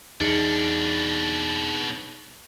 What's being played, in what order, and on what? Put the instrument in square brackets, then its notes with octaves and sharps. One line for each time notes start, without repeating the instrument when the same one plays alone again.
[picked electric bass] E2 [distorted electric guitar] B2 D4 [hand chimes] D#4 G#4